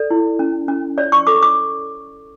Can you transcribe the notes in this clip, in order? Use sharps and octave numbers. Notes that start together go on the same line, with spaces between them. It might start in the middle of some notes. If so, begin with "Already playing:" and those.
Already playing: A4 D5
E4
C#4
C#4
C#5 D5
C#6
A4 D6
D6